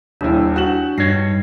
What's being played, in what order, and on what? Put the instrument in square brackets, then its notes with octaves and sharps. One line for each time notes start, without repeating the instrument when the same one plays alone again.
[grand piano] D#1 D#2 E4 [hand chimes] D4
[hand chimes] D4 [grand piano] F#4 E7 F#7
[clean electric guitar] G2 C#5 [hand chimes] D#4 A#6 C7